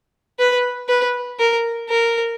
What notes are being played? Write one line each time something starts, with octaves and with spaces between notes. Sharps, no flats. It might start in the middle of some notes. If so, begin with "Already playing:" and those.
B4
B4
A#4
A#4